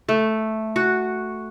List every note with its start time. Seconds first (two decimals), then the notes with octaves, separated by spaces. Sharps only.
0.09 A3
0.76 F#4